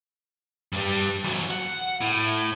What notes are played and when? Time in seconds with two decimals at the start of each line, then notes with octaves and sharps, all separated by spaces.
0.72 G2 G3
1.24 E3 F#3
1.51 F#5
2.01 A2